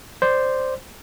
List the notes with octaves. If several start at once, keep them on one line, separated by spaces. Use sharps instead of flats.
C5 D5